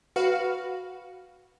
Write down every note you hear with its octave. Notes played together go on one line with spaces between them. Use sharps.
F#4 B4 F5